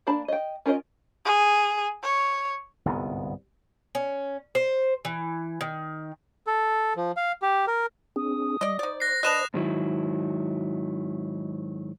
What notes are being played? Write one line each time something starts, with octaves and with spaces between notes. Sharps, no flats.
A#3 D4 D5 A5 B5
D#5 G5
C#4 F4 A#4 B4 D#5
G#4
C#5
G1 C2 G#2 B3
C#4
C5
E3
D#3
A4
F3
F5
G4
A#4
C4 D4 G#4 D#6
G3 D5 D#5
D#4 C5 D5
F#6 A#6 C7
D4 B4 D#5 D#6 F#6 E7 F7
G#2 D#3 F#3 E4